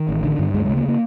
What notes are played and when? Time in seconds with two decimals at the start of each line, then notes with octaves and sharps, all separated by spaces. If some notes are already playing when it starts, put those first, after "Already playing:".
Already playing: D#3
0.09 A1
0.24 D3
0.39 G2
0.54 D2 G#3
0.65 C#3 G#3
0.77 A#3
0.88 A#3